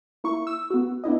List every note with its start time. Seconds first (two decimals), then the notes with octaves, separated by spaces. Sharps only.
0.24 A#3 E4 C#6
0.47 E6
0.70 B3 F#4
1.04 B3 D4 E4 D#5